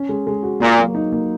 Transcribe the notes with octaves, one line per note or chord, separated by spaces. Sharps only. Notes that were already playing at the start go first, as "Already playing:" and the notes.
Already playing: C#4
G#3
G#3
F#4
A#2 A#3
F#3
D#4
A#3